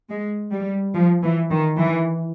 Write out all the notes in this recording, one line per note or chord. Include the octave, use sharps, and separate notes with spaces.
G#3
G3
F3
E3
D#3
E3